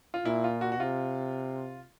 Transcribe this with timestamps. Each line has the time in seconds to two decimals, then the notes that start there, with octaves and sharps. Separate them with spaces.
0.14 F4
0.25 A#2 E4
0.44 F4
0.61 F#4
0.72 F#4
0.79 C3 F4